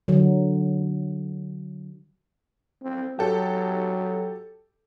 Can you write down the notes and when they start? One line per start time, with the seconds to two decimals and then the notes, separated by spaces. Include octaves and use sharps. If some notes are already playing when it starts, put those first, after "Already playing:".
0.08 D3 F#3
2.82 C4
3.19 F#3 G4 A4